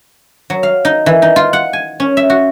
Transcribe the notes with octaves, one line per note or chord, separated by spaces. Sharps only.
F#3
F5
D#4
E3
D#4
F4
F#5
G#5
C#4
E5
F#4